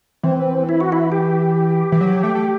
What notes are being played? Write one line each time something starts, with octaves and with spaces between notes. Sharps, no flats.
E3 C4
E4
F#4
E4
G4
E3
F#3
A3
A3